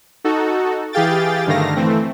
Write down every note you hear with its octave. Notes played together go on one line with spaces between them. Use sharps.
D#4 F#4 A4
E3 G4 G#4 F5 G5 A6
G2 D3 D#3 A3 F5 A#6
E3 A3 C4